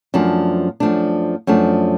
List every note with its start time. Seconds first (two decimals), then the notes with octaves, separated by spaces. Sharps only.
0.14 F#2 F3 A3 D4
0.80 F#2 F3 A3 D4
1.47 F#2 F3 A3 D4